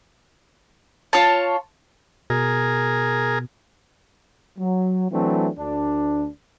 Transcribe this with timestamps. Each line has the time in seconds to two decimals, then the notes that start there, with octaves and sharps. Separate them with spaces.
1.13 F4 C#5 A5
2.30 B2 G#4 A#4
4.59 F#3
5.11 E3 F#3 A3 C4 D4
5.58 D2 D4